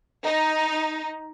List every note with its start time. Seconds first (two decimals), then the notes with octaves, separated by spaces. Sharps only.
0.24 D#4